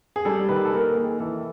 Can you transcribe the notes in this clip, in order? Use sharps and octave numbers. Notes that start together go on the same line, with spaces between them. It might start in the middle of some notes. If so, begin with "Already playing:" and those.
G#4
G3 A4
D#3 B4
A4
A#3 A#4
D#3 G#4
E3 A4